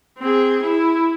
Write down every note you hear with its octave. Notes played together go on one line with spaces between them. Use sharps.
C4 G#4
E4